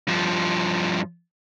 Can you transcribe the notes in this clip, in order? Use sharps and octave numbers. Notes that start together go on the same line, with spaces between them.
G2 F3